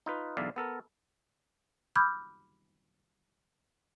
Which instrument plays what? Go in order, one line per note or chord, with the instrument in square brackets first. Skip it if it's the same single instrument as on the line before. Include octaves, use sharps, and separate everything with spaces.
[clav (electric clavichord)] D#4 F4 B4
B1 E2 D3 D5 E5 F5
B3 A4 A#4
[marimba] B5 D6 E6 F6 G6 G#6